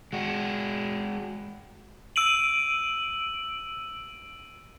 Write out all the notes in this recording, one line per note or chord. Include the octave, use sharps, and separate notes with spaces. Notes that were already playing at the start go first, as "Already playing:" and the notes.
G#3 F#4
E6 D7 D#7 F#7